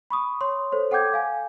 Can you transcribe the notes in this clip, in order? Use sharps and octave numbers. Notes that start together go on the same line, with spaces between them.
B5 C#6 D#6
C#5 C6
A4 C5 C#5
A4 F#5 G5 D6 G6 G#6
F5 G#5